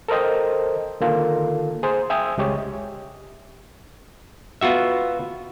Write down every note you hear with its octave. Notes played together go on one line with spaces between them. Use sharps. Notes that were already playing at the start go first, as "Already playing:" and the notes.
A4 A#4 C5 D#5 G5
D3 D#3 A#3 F4 A4
G#4 C5
E5 G5 G#5 D#6
C#2 G#3 G4 C#5
B3 F4 F#4 E5